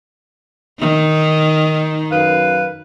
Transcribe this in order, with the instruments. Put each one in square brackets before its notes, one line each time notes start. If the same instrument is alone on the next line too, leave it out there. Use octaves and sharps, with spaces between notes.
[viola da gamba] D#3 D#4
[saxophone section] F#2 B4 F5